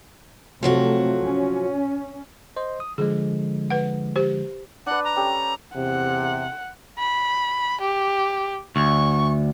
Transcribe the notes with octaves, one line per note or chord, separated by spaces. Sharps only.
C3 F3 F#3 A3 C4 F#4
C#4
C5 D#5 C6
D#6
D3 F3 G#3 G#4
B4 F#5
G4 C5
D4 B4 F#5
A#5
C#4 G4 A4
E2 C3 F#5
B5
G4
D2 C#6